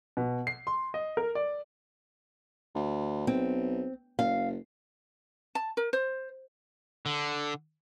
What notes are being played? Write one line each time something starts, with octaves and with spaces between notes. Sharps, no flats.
B2
C7
C6
D#5
A#4
D5
D2
B1 C4
F#1 F5
A5
A#4
C5
D3